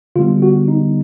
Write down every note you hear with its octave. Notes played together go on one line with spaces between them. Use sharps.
D3 G3 B3 F4
F#4
D#4